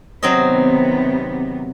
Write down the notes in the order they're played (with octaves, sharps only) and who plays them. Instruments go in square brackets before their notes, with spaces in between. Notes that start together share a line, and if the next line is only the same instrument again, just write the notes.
[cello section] C3 D#3 B3 [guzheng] F#3 C4 D#5